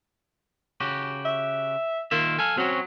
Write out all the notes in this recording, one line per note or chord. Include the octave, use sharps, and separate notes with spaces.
C#3 F#4 G4
E5
D#3 A#3 F4 E5
A4 F5 G#5
F#3 C4 C#4 F#4